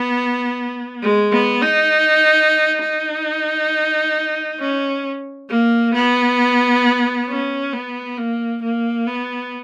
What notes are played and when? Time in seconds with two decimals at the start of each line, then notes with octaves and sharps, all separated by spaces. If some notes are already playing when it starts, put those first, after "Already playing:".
Already playing: B3
1.02 G#3
1.32 B3
1.62 D#4
2.81 D#4
4.60 C#4
5.49 A#3
5.94 B3
7.29 C#4
7.73 B3
8.18 A#3
8.62 A#3
9.07 B3